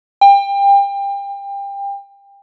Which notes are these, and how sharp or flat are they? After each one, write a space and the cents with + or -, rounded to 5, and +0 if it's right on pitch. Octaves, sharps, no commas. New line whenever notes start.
G5 +30